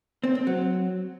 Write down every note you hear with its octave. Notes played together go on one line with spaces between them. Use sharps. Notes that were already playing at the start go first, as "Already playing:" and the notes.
C4
C4
F#3